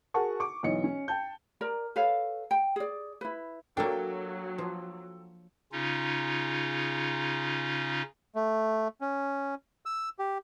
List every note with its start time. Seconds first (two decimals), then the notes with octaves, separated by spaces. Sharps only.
0.14 F#4 G#4 A#4 F#5 A5 C#6
0.40 C#6 D6
0.63 B1 E3 D#4 C#5 D#5 C#7
0.84 C#4
1.08 G5 A5 G6
1.61 A#4 D5 A#5
1.96 A4 B4 C#5 F5
2.51 G5
2.76 G#4 D5
3.21 E4 B4
3.77 F#3 A#3 D4 A4 G5
4.58 F3
5.72 C#3 C#4 D#4 F4
8.35 A3
9.01 C#4
9.86 E6
10.19 G4